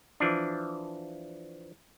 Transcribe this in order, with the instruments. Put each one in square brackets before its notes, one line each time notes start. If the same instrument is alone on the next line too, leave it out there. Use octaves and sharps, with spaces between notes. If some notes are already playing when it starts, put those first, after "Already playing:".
[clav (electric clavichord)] E3 F3 D4